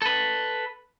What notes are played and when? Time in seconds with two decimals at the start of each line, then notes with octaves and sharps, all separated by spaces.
0.02 A4 B4